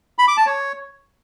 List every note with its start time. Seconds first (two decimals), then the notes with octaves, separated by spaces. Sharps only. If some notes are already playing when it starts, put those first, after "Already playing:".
0.19 B5
0.28 D6
0.37 A5
0.46 C#5